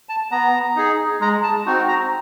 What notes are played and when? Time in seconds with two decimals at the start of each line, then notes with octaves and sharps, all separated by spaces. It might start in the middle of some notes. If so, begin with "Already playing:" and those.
0.09 A5
0.31 B3 A#5
0.76 D#4 G#4
1.21 G#3 A#5
1.44 A5
1.66 C4 D#4 F#4
1.88 A#5